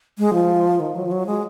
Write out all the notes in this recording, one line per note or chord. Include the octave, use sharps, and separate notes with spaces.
G#3
F3
D#3
F#3
F3
F#3
G#3